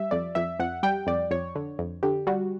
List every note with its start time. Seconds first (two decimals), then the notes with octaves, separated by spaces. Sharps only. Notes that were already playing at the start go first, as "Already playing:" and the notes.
Already playing: G3 E5
0.11 F2 D5
0.35 F2 E5
0.59 F2 F#5
0.83 G3 G5
1.07 F2 D5
1.31 F2 C#5
1.55 D3
1.79 F2
2.03 D3 G4
2.27 G3 F#4